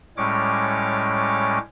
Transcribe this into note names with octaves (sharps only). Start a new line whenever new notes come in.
A2 G3 G#3 C#4 C#5 D6